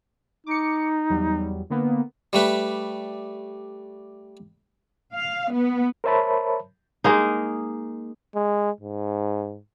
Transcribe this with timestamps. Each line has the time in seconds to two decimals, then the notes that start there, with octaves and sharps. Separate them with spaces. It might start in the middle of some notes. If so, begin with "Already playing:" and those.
0.47 D#4 D6 C#7
1.10 E2 F#3 G3
1.70 D3 A#3 B3
2.33 G3 A3 B4
5.14 F5
5.51 B3
6.04 A#4 C5 C#5 E5 A5 B5
7.04 G#3 A#3 D#4
8.35 G#3
8.80 G#2